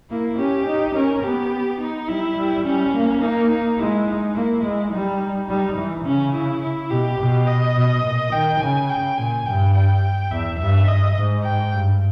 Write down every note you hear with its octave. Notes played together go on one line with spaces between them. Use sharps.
A#3 E4
C#4 G4
D#4
C#4 A#4
B3 G4
D#4
G3 E4
G3
G3 C#4
A#3
A#3 D#4
D#4
G#3 E4
D#4
A#3 E4
G#3
G3 D#4
G3 D#4
E3
C#3 C#4
E4
E4
B2 G4
B2
D#5
B2
A#2
D#3 G5
C#3 G#5
G5
A#2 G#5
G2 G5
G5
E2 E5
G2 E5
G2 D#5
G#2
G5
G2